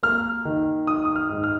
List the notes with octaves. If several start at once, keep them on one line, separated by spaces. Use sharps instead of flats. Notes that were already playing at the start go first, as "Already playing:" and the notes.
A#3 F6
D#3
D#4 D#6
D#6
F6
G#2
F6